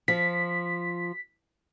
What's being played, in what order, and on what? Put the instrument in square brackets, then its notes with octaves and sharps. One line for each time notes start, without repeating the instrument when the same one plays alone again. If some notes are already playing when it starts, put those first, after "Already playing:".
[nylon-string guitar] F3 [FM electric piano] B6